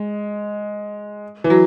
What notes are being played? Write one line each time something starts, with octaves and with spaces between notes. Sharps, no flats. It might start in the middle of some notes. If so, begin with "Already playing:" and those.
Already playing: G#3
E3
F#3